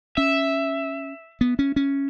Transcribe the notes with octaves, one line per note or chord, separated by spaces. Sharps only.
C#4 E5
B3
C#4
C#4